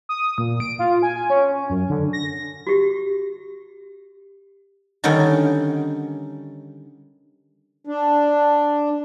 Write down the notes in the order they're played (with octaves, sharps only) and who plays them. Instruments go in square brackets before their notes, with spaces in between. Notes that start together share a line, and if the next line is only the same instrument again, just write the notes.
[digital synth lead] D#6
A#2
D7
F4
G#5
C#4
F#2
D3
A#6
[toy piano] F#4 G4
[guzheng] D3 D#3 G3 C#4 D#4 F#5
[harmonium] D4